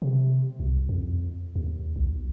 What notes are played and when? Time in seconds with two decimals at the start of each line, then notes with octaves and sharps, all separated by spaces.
0.02 C3
0.60 C2
0.89 F2
1.56 D#2
1.96 B1